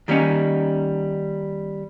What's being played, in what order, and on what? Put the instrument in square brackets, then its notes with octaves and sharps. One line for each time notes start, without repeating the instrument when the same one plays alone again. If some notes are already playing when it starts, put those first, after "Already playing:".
[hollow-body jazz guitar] D#3 G3 A#3 C#4 D#4